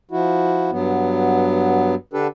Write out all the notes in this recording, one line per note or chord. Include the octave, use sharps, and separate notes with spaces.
F3 E4 F#4
G2 F#3 B3
D3 D4 G4 A4 B4